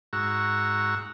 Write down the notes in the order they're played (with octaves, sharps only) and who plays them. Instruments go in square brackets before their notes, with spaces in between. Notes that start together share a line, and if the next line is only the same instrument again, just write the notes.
[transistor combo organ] G#2 F#4 A#5 C#6 E6